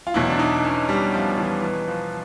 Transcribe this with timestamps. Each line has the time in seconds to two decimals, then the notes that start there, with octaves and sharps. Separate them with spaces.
0.07 F4
0.14 E2 B2 F#3 E4
0.29 D4
0.39 D#4
0.64 C#4
0.89 G3
1.14 F3
1.38 E3
1.62 E3
1.87 F3